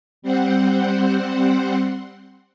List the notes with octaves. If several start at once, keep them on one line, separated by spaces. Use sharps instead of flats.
G3 C4 C5 F#5